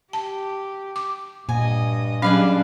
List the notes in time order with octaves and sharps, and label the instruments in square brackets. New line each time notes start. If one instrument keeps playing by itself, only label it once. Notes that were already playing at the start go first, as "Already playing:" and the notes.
[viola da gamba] G4 [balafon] A5
[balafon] D6
[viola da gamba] G2 D#5 [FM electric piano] A#2 [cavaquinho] G#5
[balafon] F#3 C#4 [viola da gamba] G3 D4 [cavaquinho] G#4 B4 F5